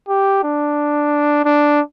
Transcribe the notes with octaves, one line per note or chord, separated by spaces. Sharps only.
G4
D4
D4